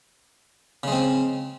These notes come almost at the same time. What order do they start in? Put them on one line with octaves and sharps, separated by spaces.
C#3 G#3 C4